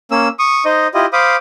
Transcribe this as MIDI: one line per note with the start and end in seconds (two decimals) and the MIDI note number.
0.11 0.28 58
0.11 0.28 61
0.11 0.28 88
0.39 0.64 85
0.39 0.64 87
0.65 0.87 63
0.65 0.87 72
0.65 0.87 75
0.94 1.06 64
0.94 1.06 65
0.94 1.06 67
0.94 1.06 75
1.13 1.36 72
1.13 1.36 77
1.13 1.36 83
1.13 1.36 86
1.13 1.36 87